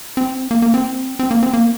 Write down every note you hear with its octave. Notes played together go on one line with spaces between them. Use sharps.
C4
A#3
A#3
C4
C4
A#3
C4
A#3